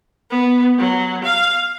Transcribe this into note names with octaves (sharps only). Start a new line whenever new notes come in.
B3
F#3
F5